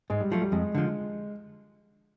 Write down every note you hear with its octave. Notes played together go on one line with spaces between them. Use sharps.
G#2 G#3
G3
F3 F#3 A3
G3
F2 G#3
D3 F3